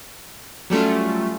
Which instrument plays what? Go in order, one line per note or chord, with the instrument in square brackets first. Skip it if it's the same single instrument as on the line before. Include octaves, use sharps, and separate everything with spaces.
[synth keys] F#3 G3 A3 C#4 F4